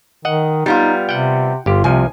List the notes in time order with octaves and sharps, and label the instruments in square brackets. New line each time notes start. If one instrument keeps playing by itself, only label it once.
[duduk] D#3 [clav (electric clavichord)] D#5 F#5
[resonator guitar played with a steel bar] G3 B3 F4 [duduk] D#4
[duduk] C3 [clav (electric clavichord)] F#5 G5
[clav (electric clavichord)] G1 G4 [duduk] F4
[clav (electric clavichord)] C2 F3 [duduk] C3 [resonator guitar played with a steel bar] G#5